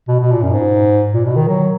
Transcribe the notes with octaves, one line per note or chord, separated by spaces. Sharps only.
B2
B2
A#2
F#2
G#2
A#2
B2
D#3
F#3